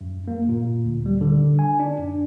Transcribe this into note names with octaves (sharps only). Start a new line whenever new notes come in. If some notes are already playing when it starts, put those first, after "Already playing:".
F#2
A#3
A#2
D2
G3
D3
G#5
D4
F#2